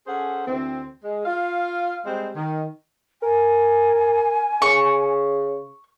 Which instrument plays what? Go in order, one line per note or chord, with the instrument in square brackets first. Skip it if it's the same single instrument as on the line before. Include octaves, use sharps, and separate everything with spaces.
[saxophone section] C#4 G#4 A4 C5 F#5
D2 E3 C4
G#3
F4 F5
G3 G#3 C4 C5
D#3
[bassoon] A#4 [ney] G#5
[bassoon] C#3 [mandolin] C#6